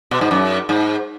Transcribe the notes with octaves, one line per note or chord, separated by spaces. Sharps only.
B2
G#2
F#2
G#2